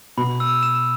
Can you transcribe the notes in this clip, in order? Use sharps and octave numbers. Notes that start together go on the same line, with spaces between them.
B2 B5
E6
E7